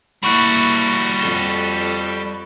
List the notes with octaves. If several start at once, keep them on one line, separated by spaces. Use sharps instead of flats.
G3 A#3 E4 F#4 B5 C#6 F#6
F2 A4 A#6 E7 G7